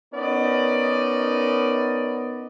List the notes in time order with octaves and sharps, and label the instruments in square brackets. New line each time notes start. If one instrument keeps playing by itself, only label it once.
[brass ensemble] B3 C#4 D#4 A#4 D5 D#5